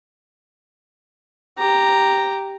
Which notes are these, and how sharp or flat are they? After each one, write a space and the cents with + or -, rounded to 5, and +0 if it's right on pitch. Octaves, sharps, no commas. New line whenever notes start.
G4 +0 A#5 +0